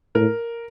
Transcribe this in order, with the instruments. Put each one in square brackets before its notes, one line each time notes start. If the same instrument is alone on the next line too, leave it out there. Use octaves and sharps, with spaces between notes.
[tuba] A2 [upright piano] A#4